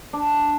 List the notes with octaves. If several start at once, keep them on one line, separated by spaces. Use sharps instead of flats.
D4